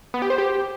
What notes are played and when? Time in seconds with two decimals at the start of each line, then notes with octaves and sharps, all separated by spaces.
0.14 B3
0.22 G4
0.30 C5
0.38 G4